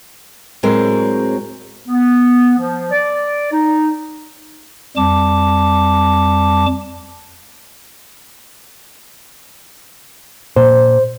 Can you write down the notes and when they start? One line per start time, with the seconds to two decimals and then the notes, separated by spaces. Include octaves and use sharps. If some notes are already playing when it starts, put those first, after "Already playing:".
0.63 A2 F#3 G#3 C4 A#4
1.87 B3
2.58 F3
2.92 D5
3.52 D#4
4.97 F2 G3 A5 D6
10.56 A#2 C5